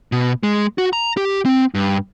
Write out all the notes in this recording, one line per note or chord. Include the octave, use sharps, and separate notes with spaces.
B2
G#3
F#4
A#5
G4
C4
G2